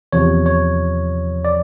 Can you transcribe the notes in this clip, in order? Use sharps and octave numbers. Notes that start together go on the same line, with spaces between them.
E2 C3 F3 C#5
C#5
D5